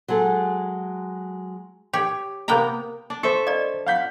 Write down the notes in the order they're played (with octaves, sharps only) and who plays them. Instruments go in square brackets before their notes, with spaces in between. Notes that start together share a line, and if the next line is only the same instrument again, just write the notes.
[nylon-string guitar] F#3 G#3 G#4 A4
[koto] G4 C#5
C3 A#3 B3 G5 A#5
[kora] D4
[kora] A4 E5 [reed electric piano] C5 C#6
[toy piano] D5 D#5
[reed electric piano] F5 [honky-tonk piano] F#5 G6 B6